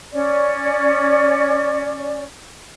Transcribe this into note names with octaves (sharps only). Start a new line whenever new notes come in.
C#4 D5